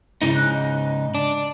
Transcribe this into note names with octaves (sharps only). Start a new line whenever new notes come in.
G#2 C#3 D#4 E4
F#6
D#5
D4